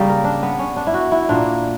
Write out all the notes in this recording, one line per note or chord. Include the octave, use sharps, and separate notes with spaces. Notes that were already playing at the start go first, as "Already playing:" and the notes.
Already playing: C#3 G3 A#3
A#4
D4
B3
C#4
D4
E4
F#4
E4
A#2 A#3 D4